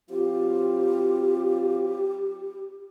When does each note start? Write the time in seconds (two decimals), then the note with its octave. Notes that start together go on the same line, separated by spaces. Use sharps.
0.10 F#3 C4 F4 G4